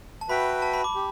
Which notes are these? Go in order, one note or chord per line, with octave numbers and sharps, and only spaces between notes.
A5
F#4 B4 E5 G5 B5
A5
B5
D6
G4